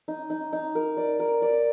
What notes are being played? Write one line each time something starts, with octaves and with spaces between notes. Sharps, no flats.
D#4
D#4
D#4
A#4
D5
A#4
D5